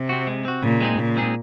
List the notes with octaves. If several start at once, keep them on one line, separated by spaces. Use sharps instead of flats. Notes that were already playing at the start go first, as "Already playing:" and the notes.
Already playing: C3
C4 F#4
G#3
C4 F#4
A#2 C#3
G#3 C4 D#4 G#4
A#2 C#3
G#3 C4 D#4 G#4